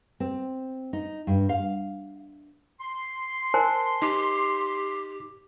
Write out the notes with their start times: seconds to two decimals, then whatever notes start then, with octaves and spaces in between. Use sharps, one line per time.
0.20 C4
0.93 D#4
1.27 G2
1.49 F5
2.81 C6
3.54 A#4 C5 G#5 A5
4.02 D#4 G4